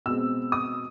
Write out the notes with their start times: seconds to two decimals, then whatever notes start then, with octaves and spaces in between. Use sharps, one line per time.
0.06 B2 G#3 C4 E6
0.52 D#6